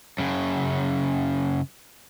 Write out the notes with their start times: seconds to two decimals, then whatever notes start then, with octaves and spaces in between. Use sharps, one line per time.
0.19 F#2 C#3